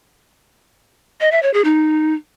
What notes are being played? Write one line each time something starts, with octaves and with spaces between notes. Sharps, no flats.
D#5
E5
C#5
G#4
D#4